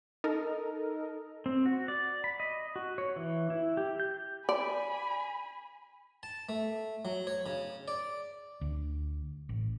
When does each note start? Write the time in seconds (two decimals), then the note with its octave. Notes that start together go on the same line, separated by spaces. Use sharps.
0.24 D#4 A4 A#4 D#5
1.46 C4
1.66 F#4
1.88 D5
2.24 B5
2.40 D#5
2.76 F#4
2.98 C#5
3.16 E3
3.50 E4
3.77 G4
4.00 G6
4.49 D5 G#5 B5
6.23 A5
6.49 A3
7.05 F#3
7.27 C#5
7.46 C#3
7.88 D5
8.61 D2
9.49 A1